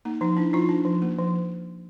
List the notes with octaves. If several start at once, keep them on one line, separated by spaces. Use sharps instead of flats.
A#3 D#4
F3 D#4
D4 E4
F3 D#4 F4
D4
F3
A#3
F3